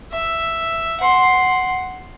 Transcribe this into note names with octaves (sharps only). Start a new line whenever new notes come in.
E5
F#5 C6